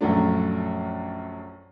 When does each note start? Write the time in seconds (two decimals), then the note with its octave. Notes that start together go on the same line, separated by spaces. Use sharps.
0.01 A#1 F#2 F#3 A3 D4